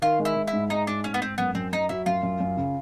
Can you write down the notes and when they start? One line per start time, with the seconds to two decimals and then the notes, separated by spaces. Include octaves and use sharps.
0.02 D#3 F4
0.19 G#3
0.25 E4
0.36 G#3
0.48 E4
0.53 G#2
0.70 G#3 D#4
0.87 G#2 D4
1.04 G#2 C#4
1.14 B3
1.21 G#2 C4
1.38 F#2 B3
1.55 F#2 C4
1.73 F#2 D#4
1.89 F#3 E4
2.06 F#2 F4
2.23 F#2
2.40 F#2
2.57 C#3